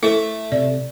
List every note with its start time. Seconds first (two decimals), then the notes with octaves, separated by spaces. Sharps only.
0.03 A3 E4 C5
0.52 C3 D5